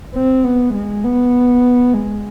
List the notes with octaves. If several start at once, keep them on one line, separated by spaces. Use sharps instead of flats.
C4
B3
G#3
B3
G#3